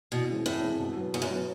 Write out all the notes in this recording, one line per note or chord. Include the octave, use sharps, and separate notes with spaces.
E2 B2
C#3 E3 G#3 C4
E2 A2
C#3 E3 G#3 C4
B2
F#3 B3
G#2 B2
F#2
F#3 B3